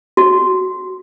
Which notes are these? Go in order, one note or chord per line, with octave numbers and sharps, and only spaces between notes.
F#4